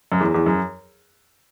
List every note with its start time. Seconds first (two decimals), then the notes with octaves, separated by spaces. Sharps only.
0.12 F#2
0.20 E2
0.34 E2
0.46 F#2